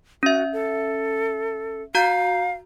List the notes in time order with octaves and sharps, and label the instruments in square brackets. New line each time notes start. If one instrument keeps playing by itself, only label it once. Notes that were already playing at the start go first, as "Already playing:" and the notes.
[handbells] C#4 E5 [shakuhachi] F#4
[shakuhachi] A4
[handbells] F#4 A#5 G6 [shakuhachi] F5